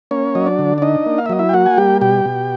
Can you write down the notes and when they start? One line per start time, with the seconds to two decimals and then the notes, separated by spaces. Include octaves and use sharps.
0.11 A#3 C#4 C#5
0.35 F#3 D#5
0.46 D4 D5
0.59 D3
0.78 D5
0.82 D4 D#4 D#5
1.06 A#3
1.18 F5
1.26 E5
1.29 F#3 D#5
1.39 E4 E5
1.49 G5
1.53 A#3 F#4 F#5
1.66 G#5
1.78 G3 G4 G5
2.01 B2 G4 G5
2.25 B2